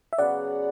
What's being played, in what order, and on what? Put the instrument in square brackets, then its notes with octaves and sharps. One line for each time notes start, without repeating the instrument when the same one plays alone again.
[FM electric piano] E5
[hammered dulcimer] C#3 F#3 B3 [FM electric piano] D5 F#5